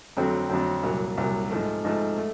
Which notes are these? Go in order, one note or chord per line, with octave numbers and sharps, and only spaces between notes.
F2 D3 F#3 A3 C4
F2 D3 F#3 A3 C4
C2 A#2 F#3
C2 A#2 F#3
G#2 F3 A3
G#2 F3 A3
A3